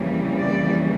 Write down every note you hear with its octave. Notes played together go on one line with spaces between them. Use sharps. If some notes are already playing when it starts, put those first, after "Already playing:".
Already playing: F2 C#3 E3 G3 A#3
D5